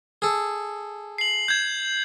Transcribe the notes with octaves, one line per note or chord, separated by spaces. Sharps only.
G#4 A4
C7 F#7
G6 G#6